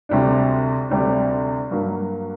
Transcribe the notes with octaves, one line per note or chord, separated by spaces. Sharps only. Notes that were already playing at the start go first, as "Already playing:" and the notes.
D2 C3 G3 D4
D2 C3 G3 D4
G2 F#3 A#3